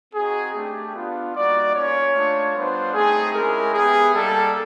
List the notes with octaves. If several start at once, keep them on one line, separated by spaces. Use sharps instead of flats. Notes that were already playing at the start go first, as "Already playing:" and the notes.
C4 D#4 F#4 G#4
A3 D4 G4
B3 D4 F4
G3 A#3 D#4 F#4 D5
A#3 C#4 F4 C#5
A3 D4 F4
G3 B3 D4 F4 C5
A3 C4 D#4 G#4
G#3 C#4 E4 G4 A#4
B3 E4 G4 G#4
G3 A#3 D#4 A4